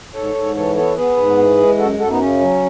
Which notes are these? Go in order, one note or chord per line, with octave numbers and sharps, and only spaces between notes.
G#2 A4 C#5
G#2
E3 A4 C#5
B3 A4 C#5
B3 G#4 B4
G#2
E3
G#3
F#2 F#4 A4
F#2 F#4 A4
B3 D#4
C#3 C#4
F#3